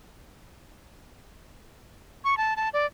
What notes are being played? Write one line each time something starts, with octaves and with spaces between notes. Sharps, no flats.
C#6
A5
A5
D5